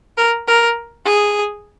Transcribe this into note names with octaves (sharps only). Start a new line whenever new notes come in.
A#4
A#4
G#4